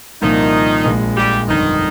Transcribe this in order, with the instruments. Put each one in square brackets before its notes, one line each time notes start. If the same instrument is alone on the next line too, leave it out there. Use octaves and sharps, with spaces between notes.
[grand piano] C2 A#2 F3 [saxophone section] D#3 D#4
[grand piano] A#1 A#2 F3 G#3
[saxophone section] G3 G4
[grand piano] G1 F2 D3 G#3 [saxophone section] D#3 D#4